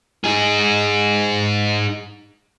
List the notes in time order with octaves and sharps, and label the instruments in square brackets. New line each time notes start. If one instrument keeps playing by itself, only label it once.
[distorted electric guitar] D#4 G#4